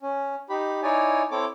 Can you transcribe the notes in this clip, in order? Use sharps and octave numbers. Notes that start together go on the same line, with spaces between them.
C#4
D#4 G4 B5
D#4 E4 C#5 D5 G#5
C4 E4 A4 C#5 D6